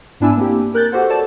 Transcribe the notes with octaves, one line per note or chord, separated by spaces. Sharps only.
G#2 B3 D4 E4 G#5 E6
A#3 C4 D4 E4 G4
A#4 F#6 G6 A6
F#4 G4 A4 C5 F#5
A4 C#5 D5 A5